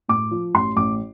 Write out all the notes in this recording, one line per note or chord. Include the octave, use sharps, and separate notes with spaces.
A2 D6
F3
A1 C6
A1 D6